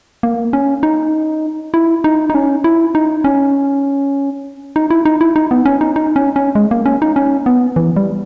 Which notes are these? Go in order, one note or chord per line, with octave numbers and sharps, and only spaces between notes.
A#3
C#4
D#4
E4
D#4
D#4
C#4
E4
D#4
C#4
D#4
E4
D#4
E4
D#4
B3
C#4
D#4
D#4
C#4
C#4
G#3
A#3
C#4
D#4
C#4
B3
E3
G3